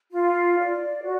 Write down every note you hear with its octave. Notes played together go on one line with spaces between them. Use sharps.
F4
D5
F#4